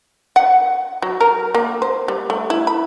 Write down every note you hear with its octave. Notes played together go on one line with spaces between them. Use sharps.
F#5
F#3
A#4
A#3
C5
G3
A3
E4
B5